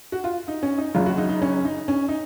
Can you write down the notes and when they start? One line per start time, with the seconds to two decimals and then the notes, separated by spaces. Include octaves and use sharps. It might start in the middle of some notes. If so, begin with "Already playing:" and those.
0.12 F#4
0.24 F4
0.48 D#4
0.63 C#4
0.78 D#4
0.94 F#1 F#2 C#3 F4
1.06 F#4
1.18 D#4
1.29 D#4
1.42 C#4
1.65 D#4
1.88 C#4
2.08 D#4